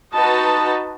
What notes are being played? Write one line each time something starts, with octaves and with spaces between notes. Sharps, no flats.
D#4 F#4 B4 D#5 A5